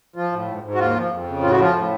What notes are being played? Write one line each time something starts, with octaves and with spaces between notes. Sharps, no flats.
F3 F4
A2
G#2
G#2
F#4
D#2 F4
F3
F2
C#3
A2 F4
F#4
F3 F4
A2